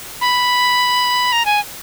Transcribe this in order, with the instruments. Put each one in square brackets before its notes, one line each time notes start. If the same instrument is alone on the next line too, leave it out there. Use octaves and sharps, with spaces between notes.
[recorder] B5
A#5
G#5